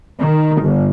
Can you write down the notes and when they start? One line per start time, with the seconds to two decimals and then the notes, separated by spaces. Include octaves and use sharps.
0.19 D#3
0.61 G1